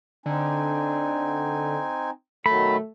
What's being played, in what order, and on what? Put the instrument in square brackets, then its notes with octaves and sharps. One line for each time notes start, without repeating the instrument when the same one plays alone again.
[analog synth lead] D3 [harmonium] C4 D#4 G#5
[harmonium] B2 D#3 F#3 [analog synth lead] A3 [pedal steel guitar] B5